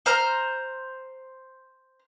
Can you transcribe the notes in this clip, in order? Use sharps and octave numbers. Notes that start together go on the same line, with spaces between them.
C5 A#5 F6